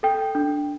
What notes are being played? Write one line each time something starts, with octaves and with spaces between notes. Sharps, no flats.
A4 G5
D4